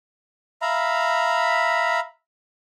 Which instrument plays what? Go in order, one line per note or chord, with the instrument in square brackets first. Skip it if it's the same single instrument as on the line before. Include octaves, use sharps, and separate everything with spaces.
[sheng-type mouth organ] E5 F5 A#5 B5